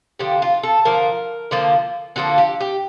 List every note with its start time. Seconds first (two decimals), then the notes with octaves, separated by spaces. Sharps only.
0.19 D3 F3 A#3 G4
0.42 F4
0.63 A4
0.85 D3 F3 A#3 A#4
1.51 D3 F3 A#3
2.16 D3 F3 A#3 A4
2.38 G4
2.60 G4